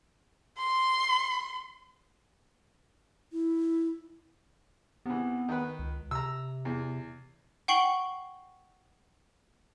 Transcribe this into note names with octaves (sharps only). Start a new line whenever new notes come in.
C6
E4
C3 E3 B3
D#3 B4
C#2
C3 A#5 E6
E2
F#5 G5 C#6 C7 F#7 G7